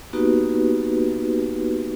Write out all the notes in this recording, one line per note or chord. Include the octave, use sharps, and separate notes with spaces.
A#3 B3 D#4 F#4 G4 B4